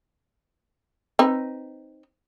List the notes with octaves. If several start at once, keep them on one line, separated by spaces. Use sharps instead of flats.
C4 D#4 B4